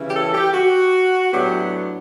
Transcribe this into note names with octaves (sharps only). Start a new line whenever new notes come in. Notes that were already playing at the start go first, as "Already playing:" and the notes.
Already playing: C#3 E3 G3 C#4
G4
A4
G4
F#4
A2 F#3 B3 D4 G4